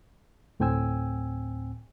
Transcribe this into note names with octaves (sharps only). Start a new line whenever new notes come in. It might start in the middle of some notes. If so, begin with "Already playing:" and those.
D2 A2 C4 G5 G#5 E6